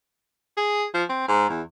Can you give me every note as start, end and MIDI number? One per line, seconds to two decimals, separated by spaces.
0.57 0.85 68
0.94 1.04 53
1.10 1.24 60
1.28 1.48 44
1.49 1.61 40